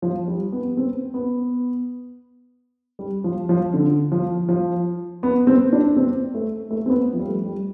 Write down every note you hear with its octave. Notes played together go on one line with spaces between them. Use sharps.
F3
G3
B3
C4
B3
G3
F3
F3
D3
F3
F3
B3
C4
D4
C4
A3
A3
C4
B3
F3
G3
A3
G3